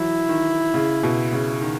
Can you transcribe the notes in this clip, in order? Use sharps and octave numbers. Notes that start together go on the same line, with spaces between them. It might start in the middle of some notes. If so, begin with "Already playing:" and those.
Already playing: E3 F#3 E4
D#3
C#3
B2
C#3
D#3